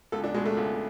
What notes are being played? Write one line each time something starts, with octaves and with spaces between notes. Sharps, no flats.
C#2 A4
D4
B2 G#3
A3
C#2